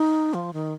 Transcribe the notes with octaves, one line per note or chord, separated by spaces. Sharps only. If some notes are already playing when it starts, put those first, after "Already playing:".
Already playing: D#4
F3
D#3